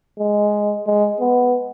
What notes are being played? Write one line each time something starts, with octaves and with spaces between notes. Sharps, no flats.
G#3
G#3
B3